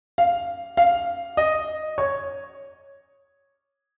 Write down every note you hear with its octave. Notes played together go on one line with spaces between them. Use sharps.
F5
F5
D#5
C#5